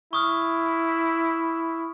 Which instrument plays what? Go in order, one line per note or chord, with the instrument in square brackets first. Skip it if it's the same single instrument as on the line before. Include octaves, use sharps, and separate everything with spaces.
[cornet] E4 [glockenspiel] C#6 D#6 F6